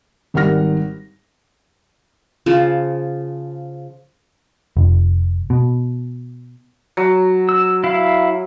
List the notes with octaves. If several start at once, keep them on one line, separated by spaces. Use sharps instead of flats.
G#1 D#3 G3 F#5 F6 A#6
C#3 F3
F1
B2
F#3
E6
E4 F5